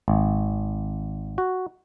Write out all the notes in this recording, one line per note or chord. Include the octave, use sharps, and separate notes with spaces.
G#1
F#4